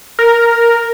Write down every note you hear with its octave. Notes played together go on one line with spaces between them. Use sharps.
A#4